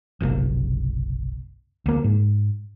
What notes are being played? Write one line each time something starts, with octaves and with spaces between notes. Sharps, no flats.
F#1 B1 C3 A#3
D2 A#3
G#2